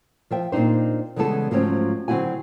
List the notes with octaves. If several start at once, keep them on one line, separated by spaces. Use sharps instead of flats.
F3 E5 G5
A#2 C4 D4 D#4 C5
C#3 E3 G3 G#3 B3 A4
G#2 F3 F#3 A3 C4 C#4
D3 F#3 C4 E4 F#4 G#5